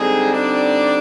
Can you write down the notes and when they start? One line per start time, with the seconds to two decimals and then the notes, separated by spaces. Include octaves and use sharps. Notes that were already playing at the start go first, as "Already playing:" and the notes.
Already playing: D3 G3 G#3 C4 D#4 G#4
0.33 D4 D5